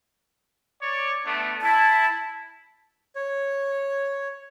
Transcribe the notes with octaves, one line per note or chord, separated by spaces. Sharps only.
C#5 D5
A3 B3 D4
E4 A5
C#5